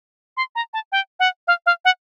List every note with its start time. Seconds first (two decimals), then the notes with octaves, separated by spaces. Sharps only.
0.37 C6
0.55 A#5
0.74 A5
0.92 G5
1.20 F#5
1.48 F5
1.66 F5
1.85 F#5